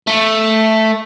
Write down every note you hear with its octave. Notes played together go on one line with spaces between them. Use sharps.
A3